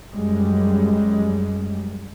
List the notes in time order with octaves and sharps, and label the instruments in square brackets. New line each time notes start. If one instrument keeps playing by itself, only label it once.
[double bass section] F#2 G3 G#3